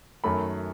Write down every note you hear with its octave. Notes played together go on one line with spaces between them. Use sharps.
F#2 D#3 F#3 A3 B5